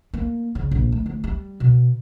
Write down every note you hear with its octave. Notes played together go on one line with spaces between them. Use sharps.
A#3
C#3
A#1
A3
D2
G3
B2